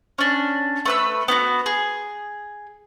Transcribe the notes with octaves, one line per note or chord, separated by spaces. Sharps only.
C#4 D4
A3 B4 E6
B3 E4 F#4
G#4